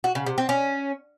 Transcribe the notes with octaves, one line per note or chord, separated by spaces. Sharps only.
F#4
C#3
C3
C4
C#4